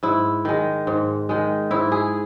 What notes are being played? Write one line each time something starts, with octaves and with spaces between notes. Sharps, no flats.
G#2 E4
D#3 G#3
G#2
D#3 G#3
G#2 E4
G#4